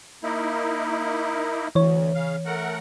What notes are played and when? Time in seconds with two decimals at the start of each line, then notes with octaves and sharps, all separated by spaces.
0.23 A#3 D#4 E4
1.75 D2 E3 C#5
2.15 C#3 F5
2.46 A3 A#4 F#5